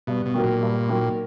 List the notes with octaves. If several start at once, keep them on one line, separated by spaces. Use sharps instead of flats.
G2 B2
B2
D#3 F#3 A#3
A#2
G2
D#3 F#3 A#3